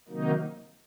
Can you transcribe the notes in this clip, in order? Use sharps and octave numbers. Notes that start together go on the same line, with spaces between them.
C3 D#3 F#3 A#3 D#4